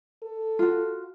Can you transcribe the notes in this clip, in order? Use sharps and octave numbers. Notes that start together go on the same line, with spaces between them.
A4
F4 F#4